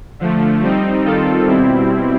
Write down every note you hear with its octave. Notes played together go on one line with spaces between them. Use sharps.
D3 F3 A3
G3 C4 D#4
D#3 G3 C4 F4 A4
B2 G3 C4 E4